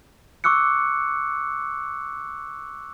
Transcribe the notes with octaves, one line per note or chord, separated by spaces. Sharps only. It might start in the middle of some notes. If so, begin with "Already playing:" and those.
C#6 D6 E6 F#6 C#7